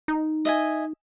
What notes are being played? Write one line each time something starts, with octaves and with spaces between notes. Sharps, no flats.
D#4
D#5 E5 G#5